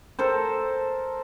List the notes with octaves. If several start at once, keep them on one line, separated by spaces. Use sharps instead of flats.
A4 A#4 C5